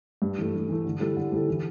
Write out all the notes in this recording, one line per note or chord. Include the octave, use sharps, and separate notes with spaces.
G2
E3 A3
G2
E3 A3
D3
G3 E4 A4
D3
G3 E4 A4
E3